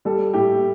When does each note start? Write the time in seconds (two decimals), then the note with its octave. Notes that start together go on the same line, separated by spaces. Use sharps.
0.05 G3 A4
0.33 A2 G4